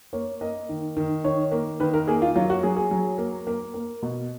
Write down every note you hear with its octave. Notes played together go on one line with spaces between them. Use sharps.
A#3 C#5
A#3 D#5
D#3
D#3
D#3 C#5
A#3
D#3 B4
A#4
A#3 G#4
F4
F#3 F4
F#4
F#3 G#4
G#4
F#3
A#3
A#3
A#3
B2